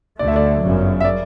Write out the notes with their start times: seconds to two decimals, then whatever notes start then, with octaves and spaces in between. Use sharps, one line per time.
0.19 D2 D3 A3 D5
0.28 E5
0.36 D5
0.62 G1 F#2 C#3 F#3
1.01 E5
1.05 D5